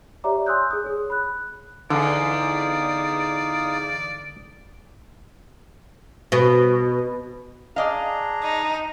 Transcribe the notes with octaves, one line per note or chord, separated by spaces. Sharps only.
G4 C#5 D5 E5 A#5 D6
G#5 C6 D#6 E6 F#6 G6
G#4 D#6
G#4 C#5
B5 F#6
E2 D3 D#4 D5 F5 D#6
B2
D4 G#4 D5 D#5 F5 A#5
D#4